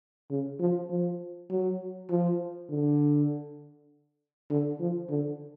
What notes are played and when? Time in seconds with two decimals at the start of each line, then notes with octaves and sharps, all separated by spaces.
0.31 C#3
0.60 F3
0.90 F3
1.51 F#3
2.10 F3
2.70 D3
4.50 D3
4.80 F3
5.09 D3